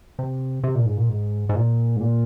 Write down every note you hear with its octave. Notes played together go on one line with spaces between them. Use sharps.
C3
C3
A#2
G#2
A#2
G#2
G#2
A#2
G#2
A#2